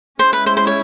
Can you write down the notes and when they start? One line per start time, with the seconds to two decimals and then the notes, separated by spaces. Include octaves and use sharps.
0.19 G#3 C#4 E4 C5
0.33 B4
0.46 C5
0.57 C5
0.67 C#5